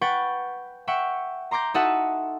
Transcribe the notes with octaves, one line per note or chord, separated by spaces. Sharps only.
B4 F#5 G5 C#6 A6
E5 F#5 G5 C#6
A#5 C6 D6 G6 A#6
D#4 F#4 A4 D#5 E5 F#5